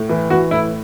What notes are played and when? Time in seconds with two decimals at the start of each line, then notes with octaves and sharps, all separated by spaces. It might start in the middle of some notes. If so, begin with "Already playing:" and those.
Already playing: A2
0.09 E3
0.30 E3 F#4
0.51 A2 E4